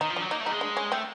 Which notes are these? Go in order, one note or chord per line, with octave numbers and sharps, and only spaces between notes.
D#3 D#4
F3
D4
F#3
A#3 D#4
A3
G3 D#4
G#3
D4
C#4
A3 C4